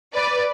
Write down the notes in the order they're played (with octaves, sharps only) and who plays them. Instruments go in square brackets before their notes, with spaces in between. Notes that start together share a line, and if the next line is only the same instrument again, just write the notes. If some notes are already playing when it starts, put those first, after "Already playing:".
[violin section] B4 D5